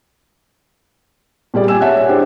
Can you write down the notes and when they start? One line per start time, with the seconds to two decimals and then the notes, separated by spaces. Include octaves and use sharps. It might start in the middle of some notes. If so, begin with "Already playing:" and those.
1.54 A#2 G3 G#4 D5
1.68 G4 G#5 E6 E7
1.81 C#5 E5 F#5 A5 F#6
1.95 C#5
2.08 D4 E4 G4 G#4 C5